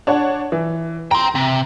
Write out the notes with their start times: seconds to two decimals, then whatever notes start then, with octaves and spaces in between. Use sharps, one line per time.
0.07 D4 C#5 F#5
0.52 E3
1.11 G5 A#5 C6
1.35 C3